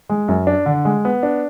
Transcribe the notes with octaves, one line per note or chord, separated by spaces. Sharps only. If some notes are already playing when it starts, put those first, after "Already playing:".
G#3
F#2
D4
D3
G#3
B3
D4